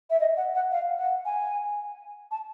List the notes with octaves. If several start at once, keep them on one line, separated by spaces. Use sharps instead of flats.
E5
D#5
F#5
F#5
F5
F#5
G#5
A5